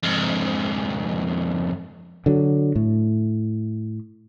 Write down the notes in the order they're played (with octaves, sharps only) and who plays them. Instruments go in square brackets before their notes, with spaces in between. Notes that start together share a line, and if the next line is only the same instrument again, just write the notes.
[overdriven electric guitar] F2 G#2
[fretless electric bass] D3 F#3
A2